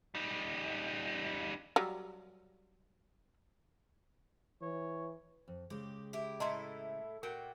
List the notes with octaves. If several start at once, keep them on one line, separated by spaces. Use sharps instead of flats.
G3 D#4
F#3 G3
E3 C#5
F2
C#3 G#3 G4
E4 G4
A2 E4 A4 D#5 A#5 C6
A#2 F#4 A#4 G5